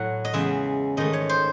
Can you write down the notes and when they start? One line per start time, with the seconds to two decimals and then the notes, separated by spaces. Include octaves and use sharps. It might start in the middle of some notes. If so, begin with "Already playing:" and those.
Already playing: A2 F#3 A3 F#5
0.25 D#5
0.33 E2 C#3 G#3 E5
0.97 G#2 D#3 A3 D#5
1.13 C#5
1.29 C5